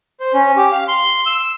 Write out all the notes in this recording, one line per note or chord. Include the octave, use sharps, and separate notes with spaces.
C5
C#4
G4
F5
C6
E6